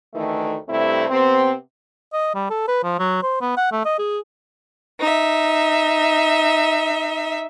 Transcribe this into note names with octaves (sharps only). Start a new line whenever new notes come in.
D2 D#3 E3 A3
G2 C3 A3 C4 E4
C3 B3 C4
D#5
G3
A4
B4
F3
F#3
C5
B3
F#5
A3
D#5
G#4
D#4 E5